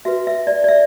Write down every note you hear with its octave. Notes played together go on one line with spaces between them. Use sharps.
F#4 B4 E5
E5
D5
D5
E5